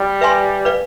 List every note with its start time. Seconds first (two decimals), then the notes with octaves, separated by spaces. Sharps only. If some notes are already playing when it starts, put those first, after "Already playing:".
Already playing: G3
0.21 B4 E5 G#5 C6
0.65 B4 D5 F5